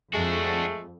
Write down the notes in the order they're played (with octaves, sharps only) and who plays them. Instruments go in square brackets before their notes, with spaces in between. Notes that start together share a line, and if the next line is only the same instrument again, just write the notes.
[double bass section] F2 [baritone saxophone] G#3 [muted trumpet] A3 [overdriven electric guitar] D4 F#4